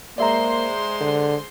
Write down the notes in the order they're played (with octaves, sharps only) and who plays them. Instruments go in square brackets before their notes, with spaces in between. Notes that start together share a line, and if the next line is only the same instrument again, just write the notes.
[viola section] G#3 C5 C6 [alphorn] A#3 [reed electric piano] D5 E5 A#5
[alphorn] D3